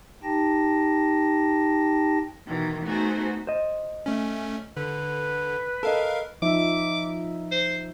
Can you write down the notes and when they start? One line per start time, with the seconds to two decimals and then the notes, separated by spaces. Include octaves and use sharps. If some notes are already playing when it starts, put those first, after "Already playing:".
0.23 D#4 G4 G5 A5 A#6
2.46 B2 D#3 E3
2.84 A3 B3 D#4 F#4 G#4 C5
3.47 C5 D#5
4.06 A3 C#4
4.77 D3 B4
5.83 A4 A#4 D#5 F5
6.42 F3 D#4 E5 D6
7.51 C5